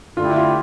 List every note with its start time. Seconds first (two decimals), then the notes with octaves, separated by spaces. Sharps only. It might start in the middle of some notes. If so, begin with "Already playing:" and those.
0.17 D3 A3 E4 F4 G4
0.36 F4